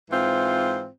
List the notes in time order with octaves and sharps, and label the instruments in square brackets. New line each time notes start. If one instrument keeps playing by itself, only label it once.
[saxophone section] G#2 E3 C4 F4